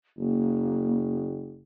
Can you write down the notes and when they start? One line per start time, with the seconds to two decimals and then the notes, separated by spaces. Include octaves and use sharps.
0.18 F#1 A#3